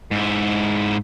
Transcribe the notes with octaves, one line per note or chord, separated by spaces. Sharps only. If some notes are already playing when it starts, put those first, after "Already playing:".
G#2 E4